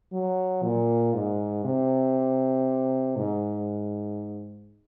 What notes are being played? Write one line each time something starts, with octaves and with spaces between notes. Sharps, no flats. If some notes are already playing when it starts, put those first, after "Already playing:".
F#3
A#2
G#2
C3
G#2